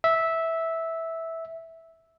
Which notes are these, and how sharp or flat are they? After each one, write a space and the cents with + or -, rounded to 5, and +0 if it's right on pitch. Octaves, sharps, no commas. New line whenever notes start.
E5 -10